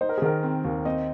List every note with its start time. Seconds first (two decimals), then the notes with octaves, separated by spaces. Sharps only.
0.01 D#4 C5
0.09 A#4
0.18 G#4
0.22 D#3 A#4
0.43 C4
0.65 D#2
0.85 C4 D#4 D#5